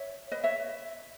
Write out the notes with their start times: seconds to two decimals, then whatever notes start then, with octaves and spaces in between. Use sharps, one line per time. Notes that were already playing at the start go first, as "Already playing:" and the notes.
Already playing: C#5 E5
0.32 B4 D#5
0.44 C#5 E5